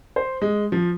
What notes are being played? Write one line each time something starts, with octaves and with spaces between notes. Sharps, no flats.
C5
G#3
F3